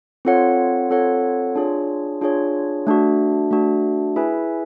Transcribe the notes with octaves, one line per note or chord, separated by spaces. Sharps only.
C4 F4 A4 C#5 F#5
C4 F4 A4 C#5 F#5
D4 F4 G#4 C#5
D4 F4 G#4 C#5
A3 D4 F#4
A3 D4 F#4
E4 G#4 B4 E5 G#5